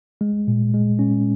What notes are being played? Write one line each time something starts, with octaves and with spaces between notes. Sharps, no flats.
G#3
A#2
G#3
C#4